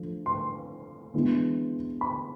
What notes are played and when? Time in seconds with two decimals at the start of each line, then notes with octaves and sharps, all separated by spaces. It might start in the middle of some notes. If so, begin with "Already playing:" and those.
Already playing: F3 A3 D4
0.26 C6
1.14 E3 G#3 B3 D4
2.01 B5